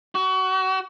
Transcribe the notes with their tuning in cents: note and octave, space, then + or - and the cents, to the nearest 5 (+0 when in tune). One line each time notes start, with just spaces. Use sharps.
F#4 +30